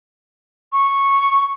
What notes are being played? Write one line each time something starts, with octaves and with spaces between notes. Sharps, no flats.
C#6